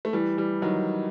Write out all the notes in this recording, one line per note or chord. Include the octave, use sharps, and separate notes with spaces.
A3
E3 G3
E3 G3
D#3 F#3